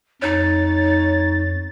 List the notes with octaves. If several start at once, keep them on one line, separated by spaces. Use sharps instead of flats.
F2 D#4 C#5 A6